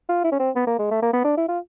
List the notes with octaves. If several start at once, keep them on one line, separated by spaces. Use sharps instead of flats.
F4
E4
C#4
C4
B3
A#3
G#3
A3
A#3
B3
D4
E4
F4